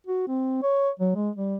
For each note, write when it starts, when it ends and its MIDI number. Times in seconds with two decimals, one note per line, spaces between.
0.07 0.27 66
0.28 0.59 60
0.63 0.90 73
1.00 1.12 54
1.15 1.30 56
1.36 1.58 55